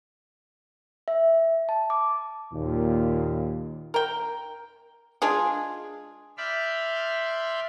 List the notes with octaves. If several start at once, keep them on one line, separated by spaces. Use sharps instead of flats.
E5
A5
D6
D#2 A#2
A#4 G5
G#3 D4 F4 G#4
D5 E5 B5 C6 F6 G6